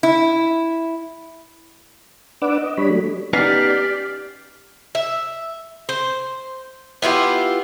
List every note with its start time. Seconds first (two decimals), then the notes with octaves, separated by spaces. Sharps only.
0.03 E4
2.42 D4 B4 D5 F#5 D6 E6
2.58 D#5
2.77 G3 D4 C#5 B5
2.90 F#3 A3
3.33 B3 C#4 D#4 G4 D5 F6 B6 C7
4.95 E5
5.89 C5
7.02 B3 E4 F4 G4